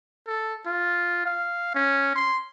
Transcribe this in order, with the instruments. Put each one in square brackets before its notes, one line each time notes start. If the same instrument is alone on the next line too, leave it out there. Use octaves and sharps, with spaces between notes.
[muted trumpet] A4
F4
F5
C#4
C6